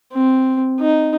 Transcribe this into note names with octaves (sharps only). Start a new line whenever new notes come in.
C4
D#4